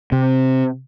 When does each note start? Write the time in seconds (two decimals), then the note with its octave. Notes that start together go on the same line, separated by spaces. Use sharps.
0.12 C3